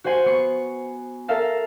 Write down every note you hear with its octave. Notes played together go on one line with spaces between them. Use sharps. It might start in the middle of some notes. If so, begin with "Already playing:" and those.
F#4 C5 F#5 G#5 C7
B3 C#6 C7
A4 A#4 E5 F5 A5